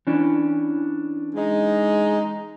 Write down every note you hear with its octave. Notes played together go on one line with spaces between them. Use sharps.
E3 C#4 D4
G#3 D#4